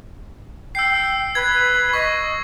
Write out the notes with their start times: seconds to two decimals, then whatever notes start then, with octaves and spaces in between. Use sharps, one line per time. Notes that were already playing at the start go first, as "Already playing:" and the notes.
0.75 G5 E6 C7
1.35 B4 G#6
1.93 D#5 C#6